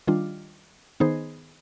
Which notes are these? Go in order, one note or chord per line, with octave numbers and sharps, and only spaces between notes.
D#3 G3 D4 F4
D#3 B3 D#4 G#4 C5